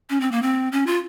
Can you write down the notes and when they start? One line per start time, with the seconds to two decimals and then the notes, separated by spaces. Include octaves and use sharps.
0.10 C#4
0.21 C4
0.32 A#3
0.42 C4
0.72 C#4
0.87 F4